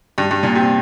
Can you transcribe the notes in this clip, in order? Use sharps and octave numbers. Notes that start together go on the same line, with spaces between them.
G2
G2
A#2
C3